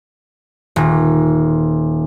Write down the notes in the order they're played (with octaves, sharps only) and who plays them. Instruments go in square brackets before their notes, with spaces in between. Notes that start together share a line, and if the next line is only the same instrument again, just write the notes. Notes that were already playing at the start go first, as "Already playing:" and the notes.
[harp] D#1